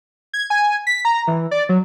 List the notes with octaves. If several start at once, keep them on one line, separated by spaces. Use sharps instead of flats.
G#6
G#5
B6
A#5
E3
D5
F#3